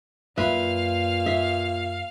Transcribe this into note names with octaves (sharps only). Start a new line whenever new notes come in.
F#2 A#2 B4 E5 F5
E5